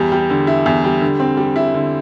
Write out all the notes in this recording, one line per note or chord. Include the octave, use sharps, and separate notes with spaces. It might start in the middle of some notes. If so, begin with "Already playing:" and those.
Already playing: E2 G3
G3
D3
E4
E2
G3
D3
C4
G3
E4
D3